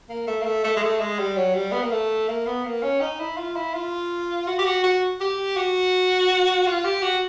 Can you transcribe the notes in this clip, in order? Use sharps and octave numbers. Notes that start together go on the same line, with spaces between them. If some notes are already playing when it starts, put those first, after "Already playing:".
A#3
A3
A#3
A3
A3
G#3
A3
G#3
G3
F#3
G3
B3
A#3
A3
A#3
B3
A#3
C#4
D#4
E4
F4
E4
F4
F#4
G4
F#4
F#4
G4
F#4
F4
G4
F#4